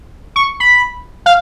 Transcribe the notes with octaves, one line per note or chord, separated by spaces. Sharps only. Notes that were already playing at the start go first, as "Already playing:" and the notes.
C#6
B5
F5